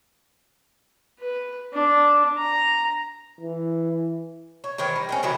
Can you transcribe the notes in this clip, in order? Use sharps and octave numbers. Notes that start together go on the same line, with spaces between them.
B4
D4
A#5
E3
C#5
D#3 E3 C5 C#5
G3 D#4
D#3 C4 C#4
D3 D#3 F#3 E4